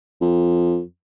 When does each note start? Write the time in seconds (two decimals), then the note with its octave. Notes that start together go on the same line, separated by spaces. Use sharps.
0.22 F2